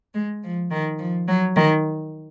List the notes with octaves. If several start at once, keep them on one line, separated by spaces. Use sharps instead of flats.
G#3
F3
D#3
F3
F#3
D#3